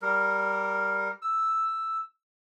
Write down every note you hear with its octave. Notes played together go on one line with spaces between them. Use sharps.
G3 A#4
E6